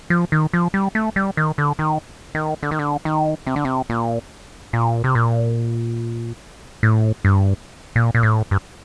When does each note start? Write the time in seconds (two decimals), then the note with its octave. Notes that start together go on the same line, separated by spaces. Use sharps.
0.10 F3
0.32 D#3
0.53 F3
0.74 G3
0.95 A3
1.16 G3
1.37 D#3
1.58 D3
1.79 D#3
2.35 D#3
2.63 D3
2.71 D#3
2.79 D3
3.05 D#3
3.47 C3
3.56 D3
3.65 C3
3.90 A#2
4.73 A#2
5.04 C3
5.15 A#2
6.83 A2
7.25 G2
7.96 A#2
8.15 A#2
8.23 A2
8.51 G2